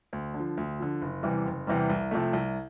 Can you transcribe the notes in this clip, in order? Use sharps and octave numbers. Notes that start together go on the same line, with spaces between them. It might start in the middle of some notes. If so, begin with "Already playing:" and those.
D2
D3
F3
D2
D3 F3
F#1
E2 C3 E3 G3
F#1
E2 C3 E3 G3
C2
C3 F3 A3
C2